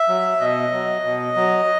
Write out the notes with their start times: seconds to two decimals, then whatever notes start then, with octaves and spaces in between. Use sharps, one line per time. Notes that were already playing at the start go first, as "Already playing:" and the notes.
Already playing: E5
0.09 F#3
0.40 B2 D#5
0.72 F#3
1.04 B2
1.36 F#3